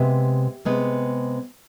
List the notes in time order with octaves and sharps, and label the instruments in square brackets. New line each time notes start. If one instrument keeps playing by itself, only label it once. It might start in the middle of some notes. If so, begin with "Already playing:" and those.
Already playing: [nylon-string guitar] C3 G#3 B3 E5
C3 G#3 B3